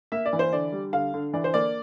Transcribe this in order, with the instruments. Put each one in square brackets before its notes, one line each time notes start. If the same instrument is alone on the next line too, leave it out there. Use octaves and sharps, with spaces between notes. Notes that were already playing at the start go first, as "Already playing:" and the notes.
[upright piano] A#3 E5
D5
E3
C5
D3 D5
G3
D3 F5
D3
E3 D5
C5
A#3 D5